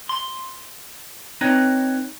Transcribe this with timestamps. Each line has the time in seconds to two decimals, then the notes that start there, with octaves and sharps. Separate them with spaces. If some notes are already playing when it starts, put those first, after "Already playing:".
0.09 C6
1.41 C4 D#4 B4 C#5 D#5